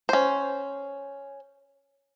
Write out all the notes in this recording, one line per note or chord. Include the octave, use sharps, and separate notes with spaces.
C#4 C5